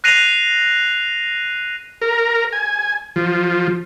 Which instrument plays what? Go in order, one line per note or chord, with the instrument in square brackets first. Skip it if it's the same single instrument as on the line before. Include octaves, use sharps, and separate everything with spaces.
[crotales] F#6 A#6 C7 D#7 F7
[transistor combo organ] A#4
G#5
F3